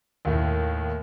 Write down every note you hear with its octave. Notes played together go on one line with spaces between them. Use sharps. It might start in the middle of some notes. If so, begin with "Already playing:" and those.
D#2 A2